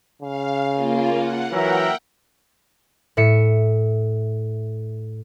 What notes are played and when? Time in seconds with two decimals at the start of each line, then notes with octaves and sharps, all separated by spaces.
0.22 C#3 F5
0.73 A#3 F4
1.15 F#5
1.52 E3 F#3 A#4 E5 F#5 G5
3.17 A2 E5 C#7